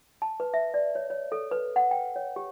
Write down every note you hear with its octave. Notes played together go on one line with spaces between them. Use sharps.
A5
B4
E5
D5
C#5
C#5
A4
B4
F#5
G5
C#5
G4